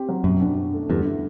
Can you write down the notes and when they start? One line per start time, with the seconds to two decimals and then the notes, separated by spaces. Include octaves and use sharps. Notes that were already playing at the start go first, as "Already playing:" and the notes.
Already playing: C4 G4
0.09 F#3
0.24 F#2 B2
0.41 D4
0.57 F#4
0.73 A3
0.89 E2 G2 D3
1.05 E4